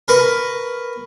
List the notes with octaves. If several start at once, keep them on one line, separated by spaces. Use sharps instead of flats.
A#4 B4 C#6